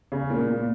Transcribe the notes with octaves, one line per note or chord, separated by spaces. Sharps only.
C#3
A#2
A#2